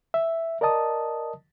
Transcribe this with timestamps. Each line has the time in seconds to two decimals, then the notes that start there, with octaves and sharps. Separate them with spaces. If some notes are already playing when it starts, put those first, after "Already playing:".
0.14 E5
0.61 A#4 D5 D#5 A5 D#6